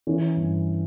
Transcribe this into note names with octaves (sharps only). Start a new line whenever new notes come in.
E3 C#4
G2